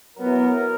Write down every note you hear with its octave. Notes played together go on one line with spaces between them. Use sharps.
F#3 B3 E4 A#4